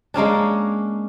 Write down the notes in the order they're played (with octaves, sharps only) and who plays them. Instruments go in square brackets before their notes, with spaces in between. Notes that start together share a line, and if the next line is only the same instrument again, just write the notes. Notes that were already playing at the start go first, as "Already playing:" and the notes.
[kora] G#3 A#3 C#4 D4